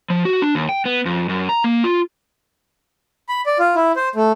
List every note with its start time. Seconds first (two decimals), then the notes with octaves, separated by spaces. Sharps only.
0.10 F3
0.25 F#4
0.42 D4
0.55 D#2
0.69 G5
0.85 B3
1.05 F2
1.29 F#2
1.49 A#5
1.64 A#3
1.84 F4
3.29 B5
3.46 D5
3.59 F4
3.76 E4
3.96 C5
4.15 A3